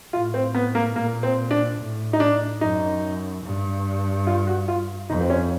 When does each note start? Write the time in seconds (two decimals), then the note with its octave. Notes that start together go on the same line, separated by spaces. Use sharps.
0.13 A2 F4
0.34 C4
0.55 B3
0.75 A#3
0.95 A#2 A#3
1.23 C4
1.51 D4
1.78 A2
2.13 D#4
2.20 D4
2.61 F#2 D#4
3.44 G2
4.27 F4
4.47 F#4
4.68 F4
5.09 F2 D#4
5.21 C4
5.30 C#4